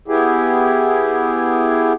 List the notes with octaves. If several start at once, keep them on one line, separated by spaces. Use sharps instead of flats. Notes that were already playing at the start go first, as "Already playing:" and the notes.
B3 E4 G4 G#4